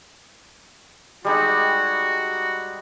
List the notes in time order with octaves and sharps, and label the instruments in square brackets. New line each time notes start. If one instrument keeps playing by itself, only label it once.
[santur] G3 G#3 D#4 [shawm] F#4